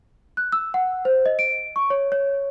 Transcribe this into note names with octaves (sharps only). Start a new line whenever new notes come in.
F#6
E6
F#5
C5
D#5
D7
C#6
C#5
C#5